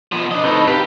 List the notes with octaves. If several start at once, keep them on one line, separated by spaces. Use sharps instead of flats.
B2 F3
D4 D#5
A2 C4 D#4 A4 B4
G4 B4 F5 G5